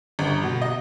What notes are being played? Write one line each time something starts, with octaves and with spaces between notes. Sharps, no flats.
G1
B2
D#5